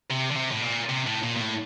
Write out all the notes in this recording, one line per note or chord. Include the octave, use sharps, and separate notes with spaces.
C3
D3
C3
A2
A#2
C3
A2
A#2
A#2
A2